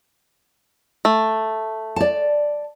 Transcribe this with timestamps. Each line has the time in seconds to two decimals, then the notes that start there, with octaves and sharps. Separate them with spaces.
1.05 A3
1.96 D5 A5